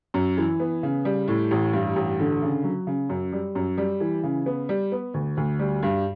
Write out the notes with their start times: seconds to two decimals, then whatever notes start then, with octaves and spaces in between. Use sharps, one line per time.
0.14 F#2
0.37 E3
0.60 B3
0.83 C#3
1.05 G3
1.28 A2
1.51 A1
1.73 G2
1.96 A1
2.20 D3
2.42 C#3
2.64 F#3
2.87 C#3
3.09 F#2
3.32 G3
3.55 F#2
3.78 G3
4.00 E3
4.23 C#3
4.46 B3
4.69 G3
4.92 B3
5.14 D2
5.37 D2
5.59 G3
5.83 G2